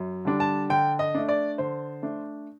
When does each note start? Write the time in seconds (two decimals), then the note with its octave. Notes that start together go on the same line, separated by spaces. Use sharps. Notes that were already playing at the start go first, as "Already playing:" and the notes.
Already playing: F#2
0.25 D3 G3 D4
0.40 A5
0.70 D3 G5
0.99 D#5
1.15 A3 D4
1.29 D5
1.58 D3 C5
2.02 A3 D4